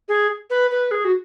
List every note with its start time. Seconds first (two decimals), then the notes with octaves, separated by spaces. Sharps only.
0.09 G#4
0.50 B4
0.71 B4
0.91 G#4
1.05 F#4